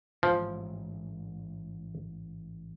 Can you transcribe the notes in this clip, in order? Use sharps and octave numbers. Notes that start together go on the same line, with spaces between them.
A1 G#2 F3